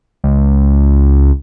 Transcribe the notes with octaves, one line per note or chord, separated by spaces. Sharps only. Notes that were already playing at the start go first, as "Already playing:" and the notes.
C#2